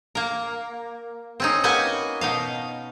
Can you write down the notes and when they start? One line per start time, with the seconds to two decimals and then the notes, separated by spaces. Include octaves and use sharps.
0.15 A#3 A#4
1.40 C4 C#4 D#4
1.64 A#3 F#4 B4 D#5 F#5 G#5
2.21 B2 D#4 F5